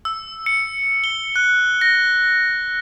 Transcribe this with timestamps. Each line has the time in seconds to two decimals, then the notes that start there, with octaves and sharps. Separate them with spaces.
0.05 E6
0.46 C#7
1.04 G7
1.36 F#6
1.81 A#6